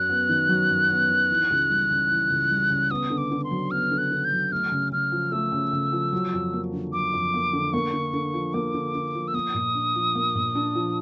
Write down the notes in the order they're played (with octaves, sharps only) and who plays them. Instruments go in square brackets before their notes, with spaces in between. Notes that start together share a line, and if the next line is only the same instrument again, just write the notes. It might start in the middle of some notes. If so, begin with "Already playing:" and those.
Already playing: [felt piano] F#2 F#3 [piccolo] F#6
[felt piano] B3
D#3
F#3
F#2
B3
D#3
E3
C#2
G3
C#3
E3
C#2
G3
C#3
[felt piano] B3 [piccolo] D#6
[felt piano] D3
[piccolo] D6
[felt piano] D3
[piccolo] C6
[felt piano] F#3
[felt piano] B3 [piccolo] F6
[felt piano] D3
[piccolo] F#6
[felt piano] D3
[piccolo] G6
[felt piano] F#3
[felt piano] A3 [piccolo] F6
[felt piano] C#3
[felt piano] C#3 [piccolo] F6
[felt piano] F3
[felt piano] A3 [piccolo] E6
[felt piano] C#3
C#3
F3
F#3
F2
A#3
D3
[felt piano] F#3 [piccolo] D6
[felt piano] F2
A#3
D3
[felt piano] A#3 [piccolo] C#6
[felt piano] D3
D3
F3
[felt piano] A#3 [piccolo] D6
[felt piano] D3
D3
F3
[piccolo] E6
[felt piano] A#3 [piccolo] D#6
[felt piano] A#2
D4
F3
A#3
A#2
D4
F3